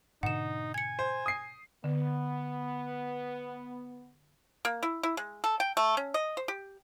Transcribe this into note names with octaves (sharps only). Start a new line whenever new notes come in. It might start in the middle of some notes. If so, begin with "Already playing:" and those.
G#2 B2 D3 D#4 F#5 E7
G#5 G#6 C#7
C5
D#6 C7
D3 B3
A#3
E4
E4
G#3
A4
G5
A3
C#4
D#5
C5
G4